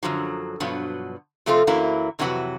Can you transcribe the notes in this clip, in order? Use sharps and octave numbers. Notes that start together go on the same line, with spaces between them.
F#2 D3 F3 F#3
G2 B2 F3 F#3 B3
C3 F3 A3 C4 F4 A4
F#2 E3 F#3 A#3 E4
F2 C3 E3 F#3 F#4 B4